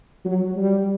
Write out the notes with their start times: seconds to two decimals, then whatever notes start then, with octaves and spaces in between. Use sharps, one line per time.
0.25 F#3
0.57 G3